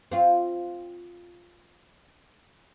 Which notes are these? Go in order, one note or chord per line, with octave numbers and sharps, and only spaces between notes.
C4 F4